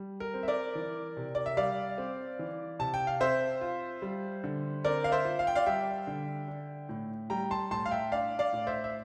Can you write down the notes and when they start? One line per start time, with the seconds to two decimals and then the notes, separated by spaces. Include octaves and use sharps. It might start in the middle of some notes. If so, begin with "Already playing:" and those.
Already playing: G3
0.20 A#4
0.34 C4
0.43 E5
0.48 A#4 D5
0.75 E3
1.17 C3
1.35 D5
1.46 E5
1.57 G3 D5 F5
1.98 C4
2.39 E3
2.79 C3 A5
2.94 G5
3.07 F5
3.21 C4 C5 E5
3.61 F4
4.02 G3
4.44 D3
4.84 C4 A#4 D5
5.04 F5
5.12 C5 E5
5.25 F4
5.39 F5
5.47 G5
5.55 D5 F5
5.66 G3 E5 G5
6.07 D3
6.48 D4
6.89 A2
7.30 G3 G5 A#5
7.51 A5 C6
7.71 A2 A5 C6
7.86 F5
7.91 E5 G5
8.12 D4 D5 F5
8.39 D5 F5
8.53 A2
8.67 C5 E5
8.84 E5